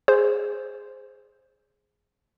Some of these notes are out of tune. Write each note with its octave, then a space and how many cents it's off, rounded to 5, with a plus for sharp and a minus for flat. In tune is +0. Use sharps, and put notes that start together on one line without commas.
G#4 +0 C5 +0